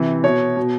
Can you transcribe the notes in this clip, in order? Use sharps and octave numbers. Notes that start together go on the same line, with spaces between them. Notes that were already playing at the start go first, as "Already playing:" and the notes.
Already playing: C3 E3
B2 C#5
B2